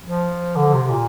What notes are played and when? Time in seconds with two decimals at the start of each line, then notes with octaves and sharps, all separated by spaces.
0.05 F3
0.56 D3
0.73 C3
0.90 A#2